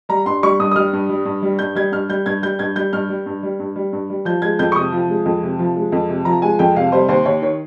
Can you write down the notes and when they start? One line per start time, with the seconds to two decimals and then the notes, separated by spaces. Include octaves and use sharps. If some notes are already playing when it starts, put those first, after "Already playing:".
0.09 G3 A#5
0.26 G2 C6
0.43 G3 C#6
0.60 G2 D#6
0.71 D#6
0.76 G3 F6
0.93 G2
1.09 G3
1.25 G2
1.42 G3
1.59 G2 G6
1.75 G3 G#6
1.92 G2 F6
2.09 G3 G6
2.26 G2 G#6
2.42 G3 G6
2.59 G2 G#6
2.76 G3 G6
2.93 G2 F6
3.09 G3
3.26 G2
3.43 G3
3.59 G2
3.76 G3
3.93 G2
4.10 G3
4.25 F3 G6
4.42 G#3 G#6
4.59 F2 G6
4.72 C#6
4.75 C3 D#6
4.92 F3
5.09 G#3
5.26 F2
5.43 C3
5.59 F3
5.76 G#3
5.92 F2
6.09 C3
6.25 F3 A#5
6.42 G#3 G#5
6.59 F2 G5
6.76 C3 F5
6.92 G3 C5
7.08 D#2 C5
7.25 D#2 C#5
7.42 D#3 C#5